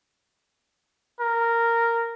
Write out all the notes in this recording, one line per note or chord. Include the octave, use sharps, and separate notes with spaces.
A#4